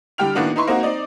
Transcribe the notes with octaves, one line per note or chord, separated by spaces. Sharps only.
D3 G3 G4 G5 F6 F7
A2 D#3 A#3 B3 D4 F#4
D#4 E4 B4 C6 C#6
A#3 C4 D#4 F#4
C4 D#4 D5 D#5